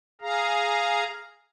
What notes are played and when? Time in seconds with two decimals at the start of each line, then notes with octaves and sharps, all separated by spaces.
0.21 G#4 F5 A#5